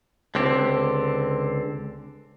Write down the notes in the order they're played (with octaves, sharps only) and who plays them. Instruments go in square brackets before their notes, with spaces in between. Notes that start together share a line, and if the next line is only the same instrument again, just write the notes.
[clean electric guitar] C#2 D3 C4 G4